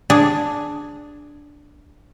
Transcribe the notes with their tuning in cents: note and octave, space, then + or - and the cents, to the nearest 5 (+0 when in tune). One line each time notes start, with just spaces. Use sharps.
D4 +0 G#4 +0